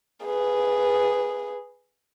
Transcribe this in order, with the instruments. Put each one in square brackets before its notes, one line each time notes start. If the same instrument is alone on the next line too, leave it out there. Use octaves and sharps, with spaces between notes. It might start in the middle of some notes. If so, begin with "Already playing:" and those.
[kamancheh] G#4 B4